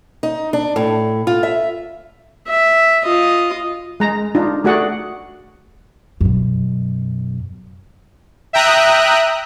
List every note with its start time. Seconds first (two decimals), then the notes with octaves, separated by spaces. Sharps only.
0.23 D#4
0.53 D4
0.76 A2
1.27 F4
1.43 E5
2.48 E5
3.05 F4 D#5
4.00 G#3 A#5
4.35 D4 D#4 F4
4.64 A3 F#4 G#4 D5 F#5
6.21 F#2 B2
8.53 E5 G5 A#5 D#6 F#6